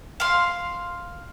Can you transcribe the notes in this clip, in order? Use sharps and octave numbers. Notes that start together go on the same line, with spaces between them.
F5 C6